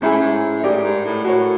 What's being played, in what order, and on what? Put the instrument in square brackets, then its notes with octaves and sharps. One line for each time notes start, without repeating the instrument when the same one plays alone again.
[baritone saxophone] G#2 [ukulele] C#4 E4 G#4
[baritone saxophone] A2
G#2
[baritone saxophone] A2 [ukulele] D#4 G4 A#4 D5
[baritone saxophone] G#2
A2
[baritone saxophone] A2 [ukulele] F#4 A#4 C#5